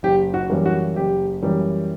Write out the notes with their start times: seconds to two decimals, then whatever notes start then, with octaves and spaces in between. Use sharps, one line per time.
0.03 F#1 G4
0.34 F#4
0.50 F#2 E3 G3 A#3
0.65 F#4
0.96 F#1 G4
1.42 F#2 E3 G3 A#3